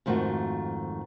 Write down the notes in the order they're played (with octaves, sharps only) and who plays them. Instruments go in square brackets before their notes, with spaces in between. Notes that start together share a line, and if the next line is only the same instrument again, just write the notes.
[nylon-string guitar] F2 G#2 D#3 A3 F4 F#4